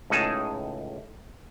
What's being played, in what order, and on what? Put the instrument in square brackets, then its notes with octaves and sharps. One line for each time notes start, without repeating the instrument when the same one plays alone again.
[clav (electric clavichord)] C#2 A2 D#4 G#4 A5